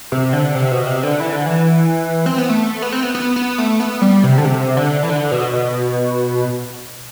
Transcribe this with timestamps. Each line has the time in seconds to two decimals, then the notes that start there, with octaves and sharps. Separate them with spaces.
0.12 C3
0.33 D3
0.55 C3
0.71 B2
0.87 C3
1.03 D3
1.20 E3
1.33 D3
1.46 E3
2.26 C4
2.38 B3
2.50 A3
2.82 B3
2.92 C4
3.03 B3
3.15 B3
3.36 B3
3.58 A3
3.80 B3
4.01 G3
4.23 C3
4.38 D3
4.45 C3
4.77 D3
5.03 E3
5.09 D3
5.32 B2
5.53 B2